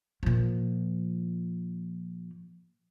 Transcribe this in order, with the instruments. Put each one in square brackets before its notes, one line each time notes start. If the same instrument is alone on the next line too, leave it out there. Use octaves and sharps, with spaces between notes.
[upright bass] A#2 F3